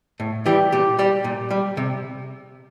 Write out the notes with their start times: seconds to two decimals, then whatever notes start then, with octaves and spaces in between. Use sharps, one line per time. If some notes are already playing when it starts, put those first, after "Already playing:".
0.20 A2
0.46 E3 G3 G4
0.72 A#2 G4
0.99 G3 G4
1.24 A#2
1.50 G3
1.77 C3